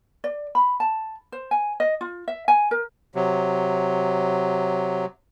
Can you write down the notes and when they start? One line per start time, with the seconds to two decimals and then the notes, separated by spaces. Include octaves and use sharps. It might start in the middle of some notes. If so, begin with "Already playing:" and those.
0.24 D5
0.55 B5
0.80 A5
1.32 C5
1.51 G#5
1.80 D#5
2.01 F4
2.28 E5
2.48 G#5
2.71 A#4
3.15 C3 F#3